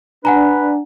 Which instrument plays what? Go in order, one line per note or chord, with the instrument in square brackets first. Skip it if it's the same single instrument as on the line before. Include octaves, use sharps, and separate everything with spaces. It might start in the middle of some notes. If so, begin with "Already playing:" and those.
[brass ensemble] D4 [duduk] B4 [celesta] F#5 G#5 A#5